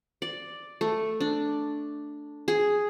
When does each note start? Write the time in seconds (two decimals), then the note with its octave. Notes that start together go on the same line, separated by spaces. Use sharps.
0.22 D5
0.81 A3
1.20 D4
2.48 G#4